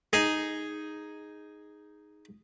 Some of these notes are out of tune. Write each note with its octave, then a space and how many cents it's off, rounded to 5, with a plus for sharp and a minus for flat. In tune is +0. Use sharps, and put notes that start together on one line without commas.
D#4 +0 G#4 +0